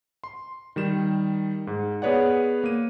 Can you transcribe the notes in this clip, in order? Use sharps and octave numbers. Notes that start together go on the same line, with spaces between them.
C6
D#3 G3 E7
G#2
B3 G#4 B4 C#5 D5 F#5
A#3 D#7